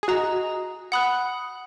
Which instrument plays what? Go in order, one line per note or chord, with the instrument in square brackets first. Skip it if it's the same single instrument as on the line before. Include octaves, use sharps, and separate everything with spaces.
[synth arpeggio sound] G#4
[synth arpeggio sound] F#4 [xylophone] D#5 A#5 D#6 F#6
[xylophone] F#5 B5 D#6 F#6